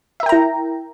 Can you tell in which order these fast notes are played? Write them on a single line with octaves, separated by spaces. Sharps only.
E5 A#4 G5 A#5 E4